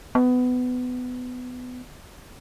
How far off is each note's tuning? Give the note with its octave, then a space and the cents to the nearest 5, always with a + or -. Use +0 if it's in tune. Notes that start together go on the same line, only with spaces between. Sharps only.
B3 +20